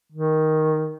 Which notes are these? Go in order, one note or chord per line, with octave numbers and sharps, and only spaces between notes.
D#3